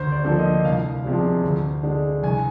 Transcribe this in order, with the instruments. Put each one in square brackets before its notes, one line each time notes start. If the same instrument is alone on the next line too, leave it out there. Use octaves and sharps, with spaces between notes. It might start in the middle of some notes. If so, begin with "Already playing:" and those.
Already playing: [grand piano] D2 C5
D5
D3 F3 A#3
D#5
C2 F5
C3 F3 G#3 D4
D2
D3 G#3 D4
C2 G#5